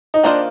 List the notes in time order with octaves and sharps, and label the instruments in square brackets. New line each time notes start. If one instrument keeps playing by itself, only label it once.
[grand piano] D#4
[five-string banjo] D#3 A#3 F4 C5 D#5 [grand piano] D4